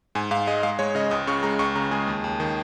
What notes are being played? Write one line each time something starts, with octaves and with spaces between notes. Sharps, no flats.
G#2 G#5
G#2 F5
G#3 D#5
G#3 F5
G#3 C#5
C#3 D#5
C#2 D#6
C#3 C#6
G#3 A#5
C#2 C#6
C#3 A#5
G#3 G#4
D#2
D#2
D#3